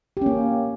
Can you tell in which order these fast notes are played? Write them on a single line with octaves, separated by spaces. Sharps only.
G4 C#4 A#3